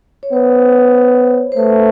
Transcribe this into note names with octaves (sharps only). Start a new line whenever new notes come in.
C#5
B3 C5
C5
A3 B4